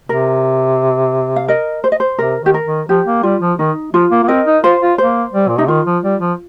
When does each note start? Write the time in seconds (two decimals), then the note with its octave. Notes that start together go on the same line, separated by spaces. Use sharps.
0.09 C3 A#4
1.36 F5
1.48 A#4 D#5
1.84 C5
1.92 D#5
2.00 C5
2.19 C3 A#4
2.42 D#3 G4
2.54 A#4
2.65 D#3
2.88 F3 G4
3.06 A#3
3.23 G3 F4
3.41 F3
3.59 D#3 D#4
3.93 F3 F4
4.11 A#3
4.24 A#3
4.28 C4 A#4 D#5
4.46 D#4
4.63 F4 C5
4.82 F4
4.98 A#3 C5
5.33 G3
5.48 A#2
5.58 C3 D#4
5.68 D#3 F4
5.86 F3
6.03 G3
6.21 F3